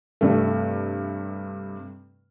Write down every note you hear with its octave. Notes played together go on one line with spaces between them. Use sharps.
G2 C3 A3